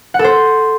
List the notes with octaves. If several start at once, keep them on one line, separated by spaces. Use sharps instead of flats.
F#5
A4
C5